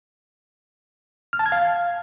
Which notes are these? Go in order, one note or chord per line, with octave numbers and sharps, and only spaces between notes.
F6
A5
G#6
F5